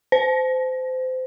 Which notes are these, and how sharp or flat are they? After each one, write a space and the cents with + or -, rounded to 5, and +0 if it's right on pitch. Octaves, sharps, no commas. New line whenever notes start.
C5 -25